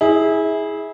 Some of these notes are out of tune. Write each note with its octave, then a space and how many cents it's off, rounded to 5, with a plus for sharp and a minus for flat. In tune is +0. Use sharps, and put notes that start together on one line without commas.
E4 -25 G#4 +0